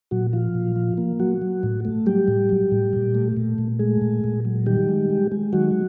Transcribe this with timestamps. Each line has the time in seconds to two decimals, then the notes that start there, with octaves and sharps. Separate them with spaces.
0.11 A#2 F#3 F#4
0.33 F3 F4
0.55 A#2
0.76 F3
0.98 A#3
1.20 F#3 F#4
1.42 F#3
1.63 A2
1.85 A3
2.06 F#3 G3 G4
2.28 A2
2.49 F#3
2.72 A2
2.93 A#2
3.15 A3
3.37 A#2
3.58 A#2
3.79 G#3 A3 G#4
4.01 A#2
4.24 A#2
4.45 F#3
4.66 D#3 G3 G4
4.89 G#3
5.10 G#3
5.32 G#3
5.53 D#3 F#3 F#4